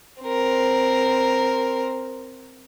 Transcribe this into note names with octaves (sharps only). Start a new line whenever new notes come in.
C4 A#4